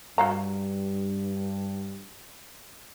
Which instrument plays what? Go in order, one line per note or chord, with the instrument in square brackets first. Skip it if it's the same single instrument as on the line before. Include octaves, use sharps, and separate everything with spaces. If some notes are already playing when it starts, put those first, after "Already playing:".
[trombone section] G2 [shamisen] F#4 F5 A#5